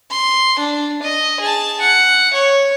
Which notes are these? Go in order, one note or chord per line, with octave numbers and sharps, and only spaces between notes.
C6
D4
D#5
G#4 A5
F#5
C#5